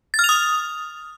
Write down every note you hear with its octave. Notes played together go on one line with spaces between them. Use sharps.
A6
F6
F7
D#6